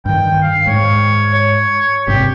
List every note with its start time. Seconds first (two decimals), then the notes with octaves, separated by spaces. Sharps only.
0.06 G2 D#3 G5
0.42 F5
0.67 G#2 C#5
1.34 C#5
2.07 G#1 G2 C3 G4